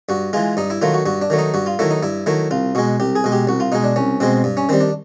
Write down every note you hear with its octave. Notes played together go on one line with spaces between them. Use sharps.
G2 F#4
E3 G#3 F4
G2 D#4
E4
D#3 F#3 A3 F4
F#4
G2 F#4
D4
D#3 F#3 A3
D#4
G2 F#4
F4
D#3 F#3 A3 E4
D#4
G2 E4
D#3 F#3 A3 E4
C2 F4
B2 G#3 F#4
C2 G4
G#4
B2 G#3
G4
C2 F#4
F4
B2 G#3 D#4
D4
C2 C#4
B2 G#3 C4
G2
C#4
D#3 G3 C4
D4